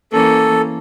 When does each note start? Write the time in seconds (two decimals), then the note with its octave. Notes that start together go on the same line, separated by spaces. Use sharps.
0.13 E3 A#3 C#4 A4